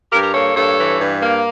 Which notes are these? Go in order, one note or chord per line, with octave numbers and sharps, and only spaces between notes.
G2 G4 A#4
A#4
A#3 A4 C#5
G2 A4 C#5
E3
G2
A#3